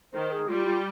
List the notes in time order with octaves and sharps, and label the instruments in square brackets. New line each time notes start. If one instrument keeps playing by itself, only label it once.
[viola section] D#3 [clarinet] C5
[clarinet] G#4
[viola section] G3 [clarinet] F4
[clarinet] F4